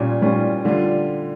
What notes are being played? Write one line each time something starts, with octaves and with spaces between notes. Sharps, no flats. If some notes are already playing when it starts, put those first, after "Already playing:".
Already playing: A#2 G3 C#4 F4
A#2 G3 C#4 F4
D3 G3 D4 F4